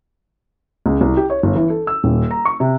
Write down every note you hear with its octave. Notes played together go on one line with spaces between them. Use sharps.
C#2
C2
G4
C#5
G1
E3
A4
E6
D#1
A#5
C#6
C3